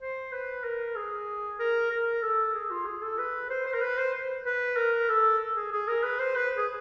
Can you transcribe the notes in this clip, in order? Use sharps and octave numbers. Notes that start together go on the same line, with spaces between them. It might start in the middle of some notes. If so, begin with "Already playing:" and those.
C5
B4
A#4
G#4
A#4
A#4
A4
G#4
F4
G#4
A4
B4
C5
C5
A#4
B4
C5
B4
A#4
A4
G#4
G#4
A#4
B4
C5
B4
G#4